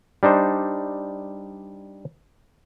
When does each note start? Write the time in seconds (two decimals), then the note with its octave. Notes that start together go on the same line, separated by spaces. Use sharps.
0.23 G3 D4 D#4 C5